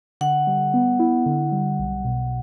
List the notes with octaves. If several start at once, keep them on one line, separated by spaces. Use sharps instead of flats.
D3 F#5
G3
B3
E4
D3
G3
B1
B2